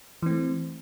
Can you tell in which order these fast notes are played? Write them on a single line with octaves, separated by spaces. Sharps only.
E3 C4 A3